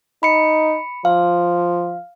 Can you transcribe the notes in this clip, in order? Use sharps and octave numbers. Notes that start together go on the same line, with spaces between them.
D#4 B5 C#7
F3 F5